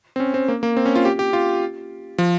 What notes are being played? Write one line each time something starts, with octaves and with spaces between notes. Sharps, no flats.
C4
C#4
C4
A#3
A#3
C4
C#4
F4
G4
G4
F4
F3